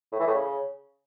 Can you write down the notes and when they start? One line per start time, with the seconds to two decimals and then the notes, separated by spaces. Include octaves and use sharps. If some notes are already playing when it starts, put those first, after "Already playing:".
0.12 A2
0.20 E3
0.27 A2
0.34 C#3